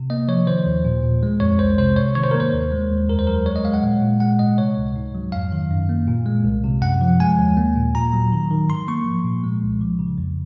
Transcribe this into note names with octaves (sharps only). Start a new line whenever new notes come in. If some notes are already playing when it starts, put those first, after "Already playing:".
Already playing: C3
A#3 D#5
F3 C#5
D#3 C5
D#2
A#2
A#2
G#3
F2 C#5
C2 C5
C3 C5
G#2 C#5
D#3 C#5
C5
A#4
A#3
C5
D#2
G#3
D#2
F2 A#4
C5
F#3 A#4
G#3 C#5
D#5
G#3 F5
F#5
A#2
A#2
G#3 F#5
G#2 D#5
C3 C#5
C#2
G#2
F#3
F2 F5
D#3
F#2
A#3
A#2
G#3
C2
C3
F#2 F#5
F3
G#3 G#5
D#2
A#3
A#2
A#2 A#5
F#3
D#3
D#3
G#2 C6
A#3 C#6
F3
A#2
G#3
C2
F3
C#3
F2